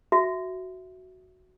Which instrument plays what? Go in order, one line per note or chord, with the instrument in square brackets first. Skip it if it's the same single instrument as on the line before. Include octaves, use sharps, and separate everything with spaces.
[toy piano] F#4 E5